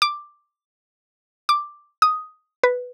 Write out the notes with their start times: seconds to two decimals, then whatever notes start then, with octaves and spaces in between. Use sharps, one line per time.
0.02 D6
1.49 D6
2.02 D#6
2.63 B4